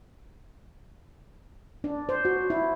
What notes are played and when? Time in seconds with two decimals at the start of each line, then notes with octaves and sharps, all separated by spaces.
1.84 D4
2.09 C5
2.25 F#4
2.50 E4